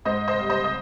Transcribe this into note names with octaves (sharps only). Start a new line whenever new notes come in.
G#2 C5 D#5
C5 D#5
G3
C5 D#5
D#5